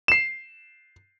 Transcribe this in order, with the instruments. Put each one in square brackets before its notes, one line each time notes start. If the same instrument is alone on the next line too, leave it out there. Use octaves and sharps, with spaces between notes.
[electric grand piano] C7 E7